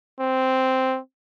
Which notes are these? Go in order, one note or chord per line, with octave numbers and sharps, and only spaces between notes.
C4